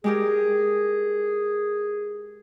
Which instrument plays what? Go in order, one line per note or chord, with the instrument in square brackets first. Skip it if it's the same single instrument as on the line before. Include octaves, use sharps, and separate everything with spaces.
[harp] G#3 G4 A#4 [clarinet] G#4